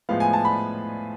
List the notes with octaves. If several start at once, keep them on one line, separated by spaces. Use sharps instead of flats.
A2 F3 G#3 B3 F5
G#5
A5
B5